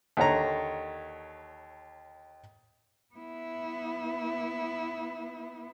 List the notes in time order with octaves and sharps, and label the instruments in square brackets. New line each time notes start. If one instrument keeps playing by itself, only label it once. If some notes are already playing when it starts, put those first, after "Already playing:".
[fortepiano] D#2 D3 C#5 A#5
[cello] B3 E4